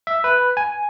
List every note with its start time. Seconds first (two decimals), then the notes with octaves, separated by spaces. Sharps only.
0.07 E5
0.24 B4
0.57 G#5